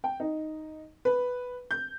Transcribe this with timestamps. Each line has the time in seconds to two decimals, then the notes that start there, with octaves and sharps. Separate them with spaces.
0.04 G5
0.20 D#4
1.05 B4
1.71 G6